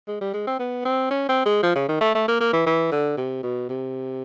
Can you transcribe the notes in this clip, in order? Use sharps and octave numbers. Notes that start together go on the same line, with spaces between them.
G#3
G3
G#3
C4
B3
C4
C#4
C4
G#3
F3
C#3
D#3
A3
A3
A#3
A#3
E3
E3
D3
C3
B2
C3